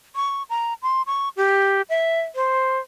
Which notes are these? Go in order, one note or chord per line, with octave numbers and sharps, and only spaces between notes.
C#6
A#5
C6
C#6
G4
E5
C5